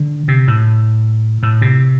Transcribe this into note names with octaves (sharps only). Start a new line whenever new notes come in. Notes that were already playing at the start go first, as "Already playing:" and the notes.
Already playing: D3
C3
A2
A2
C3